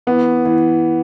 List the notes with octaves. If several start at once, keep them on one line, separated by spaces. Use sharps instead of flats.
E3 B3
E3